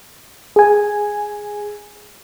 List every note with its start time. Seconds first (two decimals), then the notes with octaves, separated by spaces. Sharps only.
0.56 G#4 G#5